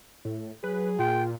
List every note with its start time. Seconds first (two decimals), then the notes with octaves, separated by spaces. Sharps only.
0.25 A2
0.64 F#3 G#4 B4
0.99 A#2 F4 G5